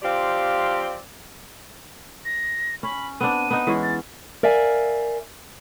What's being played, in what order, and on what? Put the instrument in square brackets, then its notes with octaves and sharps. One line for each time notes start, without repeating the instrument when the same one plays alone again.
[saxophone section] F3 C4 G4 D5 F5
[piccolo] A#6
[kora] C#4 [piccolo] B5
[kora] B3 C4 D4 [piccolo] D#7
[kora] B3 D#4
E3 G#3 C#4
[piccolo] A6
[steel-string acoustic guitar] A#4 D5 E5 F5 G#5